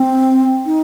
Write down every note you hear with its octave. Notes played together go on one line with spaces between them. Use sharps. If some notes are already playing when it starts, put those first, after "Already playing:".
Already playing: C4
D#4